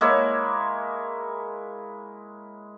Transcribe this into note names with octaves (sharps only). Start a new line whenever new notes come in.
G#3 A#3 E4 C#5